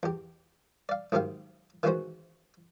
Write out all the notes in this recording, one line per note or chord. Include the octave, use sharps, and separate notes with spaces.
E2 G4
D5 F5
B1 G#2 D#3 G4 F5
D#3 E3 G#3 C#4 F#4 C5